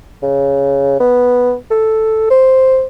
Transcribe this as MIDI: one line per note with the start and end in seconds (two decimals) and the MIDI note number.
0.23 0.96 49
1.00 1.54 59
1.71 2.29 69
2.30 2.86 72